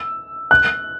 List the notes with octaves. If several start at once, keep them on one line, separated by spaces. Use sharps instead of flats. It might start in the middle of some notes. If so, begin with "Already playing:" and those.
Already playing: E6
F#6